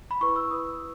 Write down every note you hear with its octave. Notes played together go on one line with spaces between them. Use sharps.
B5
E4 B4 C#6
E6
E4 B4 D#6